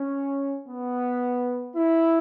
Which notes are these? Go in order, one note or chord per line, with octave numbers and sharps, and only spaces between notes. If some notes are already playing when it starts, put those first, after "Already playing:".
Already playing: C#4
B3
E4